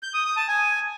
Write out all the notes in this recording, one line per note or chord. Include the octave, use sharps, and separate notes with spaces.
G6
D#6
D#6
A5
G#5